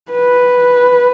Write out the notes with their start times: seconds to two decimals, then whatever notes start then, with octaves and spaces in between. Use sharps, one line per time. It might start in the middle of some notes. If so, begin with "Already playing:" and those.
0.11 B4